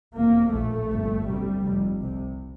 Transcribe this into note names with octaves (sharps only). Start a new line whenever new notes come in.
F1 E2 C3 A#3
A#1 A2 A3
G1 F2 C3
D2 C3 G3
F1 F2 C3
C2 C3